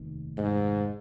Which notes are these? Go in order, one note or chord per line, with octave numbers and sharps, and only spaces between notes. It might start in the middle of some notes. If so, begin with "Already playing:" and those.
Already playing: F1 D#2 D#3
G#2